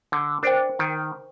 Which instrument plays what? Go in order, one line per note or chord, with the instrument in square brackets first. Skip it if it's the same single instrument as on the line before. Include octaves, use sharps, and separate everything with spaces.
[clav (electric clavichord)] D3
[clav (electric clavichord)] D4 [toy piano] A#4 C5 G5
[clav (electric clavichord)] D#3